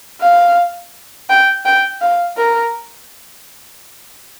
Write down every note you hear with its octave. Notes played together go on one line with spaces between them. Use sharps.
F5
G5
G5
F5
A#4